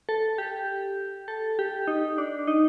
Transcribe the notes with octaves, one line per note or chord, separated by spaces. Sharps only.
A4
G4
A4
G4
D#4
D4
D#4